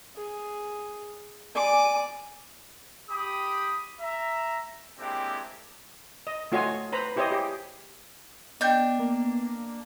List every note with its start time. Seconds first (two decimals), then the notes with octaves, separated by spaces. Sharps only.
0.17 G#4
1.55 D5 G#5 D6
3.10 G4 B5 D#6
4.01 E5 A#5
4.99 G#3 A#3 C4 D4 E4 G4
6.27 D#5
6.52 A3 F4 F#4 C#5 D#5 G#5
6.92 B4 C5 A#5 B5
7.16 E4 G4 C5 C#5 D#5
7.32 G4 G#4
8.61 B3 D4 D#5 G5 G6
8.99 A#3